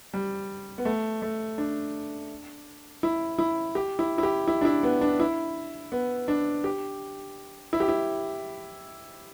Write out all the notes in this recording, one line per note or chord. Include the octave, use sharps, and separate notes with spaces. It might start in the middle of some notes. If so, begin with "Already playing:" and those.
G3
B3
A3
A3
D4
E4
E4
G4
E4
E4
G4
E4
D4
E4
B3
D4
E4
B3
D4
G4
E4
G4
E4